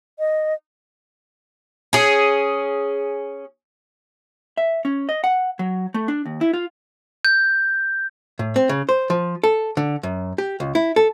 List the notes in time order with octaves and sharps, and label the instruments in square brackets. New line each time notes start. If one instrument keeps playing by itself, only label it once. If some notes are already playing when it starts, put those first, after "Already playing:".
[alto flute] D#5
[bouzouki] C#4 G#4
[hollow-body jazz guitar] E5
C#4
D#5
F#5
F#3
A3
D4
D#2
E4
F4
[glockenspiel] G6
[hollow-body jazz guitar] A2
C4
C#3
C5
F3
A4
D3
F#2
G4
C#2
E4
A4